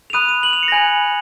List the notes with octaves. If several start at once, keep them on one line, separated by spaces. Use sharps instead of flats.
F7
B5 D#6 F#6 D#7
D#7
F#7
F7
C#7
A#6
G#5 B5 F#6 G#6